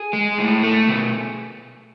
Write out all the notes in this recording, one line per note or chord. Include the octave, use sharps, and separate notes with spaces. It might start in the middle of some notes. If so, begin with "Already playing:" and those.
Already playing: G#4
G#3
A2
A3
B2